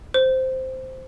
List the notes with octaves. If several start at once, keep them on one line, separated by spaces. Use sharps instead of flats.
C5